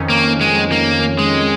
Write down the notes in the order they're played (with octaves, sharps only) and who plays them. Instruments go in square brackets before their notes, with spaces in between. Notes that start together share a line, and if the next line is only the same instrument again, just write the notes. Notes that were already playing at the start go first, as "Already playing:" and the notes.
Already playing: [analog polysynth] F2 D#3 C#4
[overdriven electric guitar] A#3
G#3
A#3
G#3